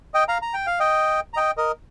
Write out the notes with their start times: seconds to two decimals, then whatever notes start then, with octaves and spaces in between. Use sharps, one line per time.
0.14 D#5 G5
0.28 F5 A#5
0.42 A#5
0.54 G5
0.67 F5
0.80 D#5 G5
1.34 A#5
1.36 D#5 G5
1.57 A#4 D#5